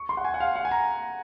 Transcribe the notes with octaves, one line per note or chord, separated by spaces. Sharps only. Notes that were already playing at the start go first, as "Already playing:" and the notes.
Already playing: C#6
C6
F#5
G#5
F#5
F5
F#5
G#5
A#5